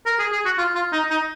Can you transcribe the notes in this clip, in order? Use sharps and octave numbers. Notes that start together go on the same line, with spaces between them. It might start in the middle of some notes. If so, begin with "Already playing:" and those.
A#4
G#4
G#4
F#4
F4
F4
D#4
D#4